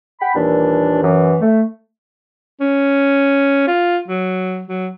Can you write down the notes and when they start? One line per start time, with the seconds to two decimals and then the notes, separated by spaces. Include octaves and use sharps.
0.21 F#5 G5 B5
0.35 D#2 A#2 E3 G3 D4
1.03 F#2 E3
1.41 A3
2.60 C#4
3.67 F4
4.08 F#3
4.68 F#3